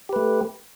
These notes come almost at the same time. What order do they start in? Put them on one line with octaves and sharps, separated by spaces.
G4 B4 A3